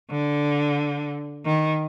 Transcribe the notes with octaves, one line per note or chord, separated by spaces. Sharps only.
D3
D#3